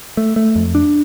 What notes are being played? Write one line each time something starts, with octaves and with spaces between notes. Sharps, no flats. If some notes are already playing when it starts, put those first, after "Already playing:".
A3
A3
F2
D4